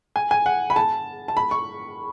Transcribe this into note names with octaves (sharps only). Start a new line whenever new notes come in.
G#5
G#5
F#5
B5
A5
A5
B5
C#6